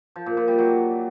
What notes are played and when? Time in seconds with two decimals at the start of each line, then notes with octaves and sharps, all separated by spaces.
0.16 F3
0.26 A#2
0.37 A#2
0.48 G3
0.59 F#3